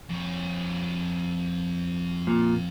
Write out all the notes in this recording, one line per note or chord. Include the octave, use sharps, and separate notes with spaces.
F2 C#5
A#2